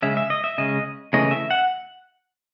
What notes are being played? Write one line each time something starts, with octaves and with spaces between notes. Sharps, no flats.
C#3 G#3 C#4 E5
E5
D#5
E5
C#3 G#3 C#4 D#5
C#3 E3 A3 C#4 D#5
E5
F#5